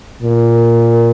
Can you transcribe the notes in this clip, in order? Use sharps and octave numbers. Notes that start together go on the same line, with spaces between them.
A#2